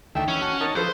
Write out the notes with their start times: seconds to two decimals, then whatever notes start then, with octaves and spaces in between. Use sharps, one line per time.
0.15 D2 D#3 A3 E5 G5
0.28 E3 C#4
0.41 F#4 A5
0.61 D#4 A#4 C#5 A5
0.76 F3 A4 B4 C5